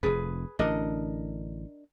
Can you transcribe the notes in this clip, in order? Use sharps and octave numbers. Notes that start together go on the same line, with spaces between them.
F1 F2 G#4 B4
A1 D3 D4 A#4 D#5